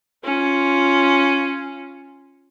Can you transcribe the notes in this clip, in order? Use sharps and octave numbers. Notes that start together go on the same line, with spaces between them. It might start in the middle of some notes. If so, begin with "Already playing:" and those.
C#4 F4